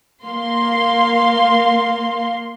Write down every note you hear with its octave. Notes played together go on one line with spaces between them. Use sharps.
A#3 F5 C6